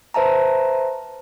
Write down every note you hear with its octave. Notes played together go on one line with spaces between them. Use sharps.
B4 C5 E5 A5 A#5